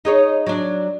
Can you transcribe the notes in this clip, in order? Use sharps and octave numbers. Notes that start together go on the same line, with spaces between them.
D#4 G#4 C#5
F#3 D4